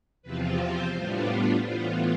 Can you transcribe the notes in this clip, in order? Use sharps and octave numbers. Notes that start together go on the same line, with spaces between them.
E2 C3 F3 C4 F4 B4
C5
A2 G3 B3 D4 F4
A2 E3 B3 F4 C5